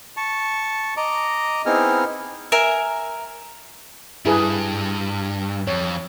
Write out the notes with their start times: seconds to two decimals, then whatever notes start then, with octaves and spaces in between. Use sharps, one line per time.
0.17 A5 C#6
0.97 D#5 A#5 D6
1.66 B3 C4 D#4 E4 G#4 F6
2.52 A#4 E5 G#5
4.26 G2 E4 G#4 B4
5.67 F2 C#5